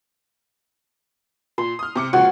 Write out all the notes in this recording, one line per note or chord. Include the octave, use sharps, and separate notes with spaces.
A#2 C6
D#6 F6
C3 D6 C#7
C#2 A#2 F3 F#4